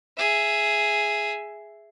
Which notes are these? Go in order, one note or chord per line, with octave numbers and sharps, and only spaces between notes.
G#4 E5